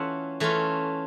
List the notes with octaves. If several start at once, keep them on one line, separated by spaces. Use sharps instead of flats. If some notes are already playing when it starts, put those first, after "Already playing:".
Already playing: E3 A3 C#4 F4 E5 F#5
E3 A3 C#4 F4